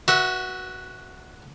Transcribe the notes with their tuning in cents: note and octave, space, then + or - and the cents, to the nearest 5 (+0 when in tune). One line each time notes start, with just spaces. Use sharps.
F#4 +0 B4 -30 E5 +0